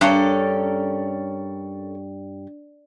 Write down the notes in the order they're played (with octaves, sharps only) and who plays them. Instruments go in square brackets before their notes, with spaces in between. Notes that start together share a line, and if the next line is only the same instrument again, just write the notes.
[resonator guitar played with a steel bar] G2 [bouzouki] C#4 A4 A#4